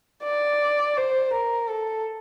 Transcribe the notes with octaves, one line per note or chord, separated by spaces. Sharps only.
D5
C5
A#4
A4